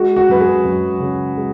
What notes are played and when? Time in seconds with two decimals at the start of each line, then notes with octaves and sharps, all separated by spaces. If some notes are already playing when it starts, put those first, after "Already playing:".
Already playing: G#3 F#4
0.16 F#4
0.29 F#2 B4
0.41 G#4
0.65 F#2
1.00 C#3
1.36 G#3